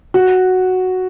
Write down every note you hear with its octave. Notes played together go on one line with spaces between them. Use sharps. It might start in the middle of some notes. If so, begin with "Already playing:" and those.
F#4